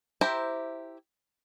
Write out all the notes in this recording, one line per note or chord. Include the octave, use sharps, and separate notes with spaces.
E4 G4 C5 E5 A#5